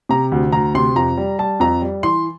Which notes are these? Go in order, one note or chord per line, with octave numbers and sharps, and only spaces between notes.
C3 A#5
D2
D2 A#5
C3 C6
F2 A#5
G3
G3 A5
F2 A#5
G3
E3 C6